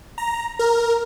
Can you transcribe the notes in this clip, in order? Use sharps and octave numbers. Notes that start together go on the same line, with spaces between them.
A#5
A#4